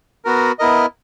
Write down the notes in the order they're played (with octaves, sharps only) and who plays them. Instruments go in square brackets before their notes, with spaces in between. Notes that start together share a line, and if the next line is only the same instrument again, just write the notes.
[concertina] B3 F#4 A#4
B3 E4 A#4 D#5